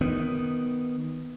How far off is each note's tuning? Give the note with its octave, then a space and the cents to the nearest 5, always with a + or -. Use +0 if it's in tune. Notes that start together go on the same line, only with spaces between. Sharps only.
D#3 +0 B3 +0